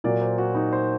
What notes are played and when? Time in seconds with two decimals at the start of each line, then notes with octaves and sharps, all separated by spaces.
0.04 A#2 F#3 A#3 D5
0.21 C5
0.38 F#4
0.55 D#4
0.73 C5